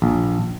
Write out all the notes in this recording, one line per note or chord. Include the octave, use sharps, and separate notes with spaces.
A#1